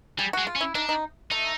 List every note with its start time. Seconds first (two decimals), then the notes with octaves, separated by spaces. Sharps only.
0.19 G3 G#4
0.33 G#3 F#4
0.47 F4
0.56 C#4
0.61 E4
0.75 D4 D#4
0.89 D#4
1.31 A3 D#4